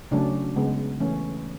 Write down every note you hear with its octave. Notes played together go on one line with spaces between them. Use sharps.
C#3 F#3 A3 C#4 D4
C#3 G#3 B3
E3 A3 C#4